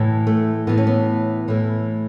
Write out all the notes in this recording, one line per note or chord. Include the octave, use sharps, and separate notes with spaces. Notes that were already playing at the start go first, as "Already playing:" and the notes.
Already playing: A2 E3
A3
A2 E3 A3 B3
C#4
B3
A2 E3 A3